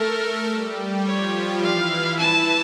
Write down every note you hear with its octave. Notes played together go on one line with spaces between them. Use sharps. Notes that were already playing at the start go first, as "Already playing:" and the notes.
Already playing: A3 A4 A#4
G3 G4
F3 F4 C#5
E3 E4 F5
A5